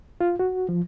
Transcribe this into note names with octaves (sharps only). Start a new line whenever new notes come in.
F4
F#4
F3